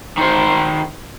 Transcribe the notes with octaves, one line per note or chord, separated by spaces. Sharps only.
D#3 C5